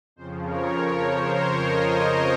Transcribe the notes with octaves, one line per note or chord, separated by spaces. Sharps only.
F2 C#3 F3 C5
A#4 C#5
A#4 C#5
C5
A#4 C#5
C5 D#5
C5